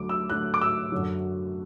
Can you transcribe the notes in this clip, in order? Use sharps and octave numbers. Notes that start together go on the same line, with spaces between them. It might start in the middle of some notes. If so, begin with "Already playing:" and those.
Already playing: D2 D3 F#3 D6
E6
D2 D3 F#3 F#6
D6
E6
F#2 D3 F#3